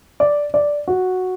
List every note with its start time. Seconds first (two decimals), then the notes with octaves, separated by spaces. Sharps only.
0.20 D5
0.54 D5
0.88 F#4